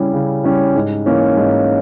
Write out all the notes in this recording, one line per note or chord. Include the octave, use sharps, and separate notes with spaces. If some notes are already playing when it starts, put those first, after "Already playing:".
Already playing: C#3 G3 C#4 E4 G4
C#3
G3 C#4 E4 G4
G#2
E3 A#3 C#4
G#2